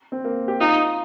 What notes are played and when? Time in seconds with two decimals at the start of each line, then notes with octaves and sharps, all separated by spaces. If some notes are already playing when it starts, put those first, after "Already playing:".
0.12 C4
0.24 A#3
0.48 G4
0.60 D#4 F4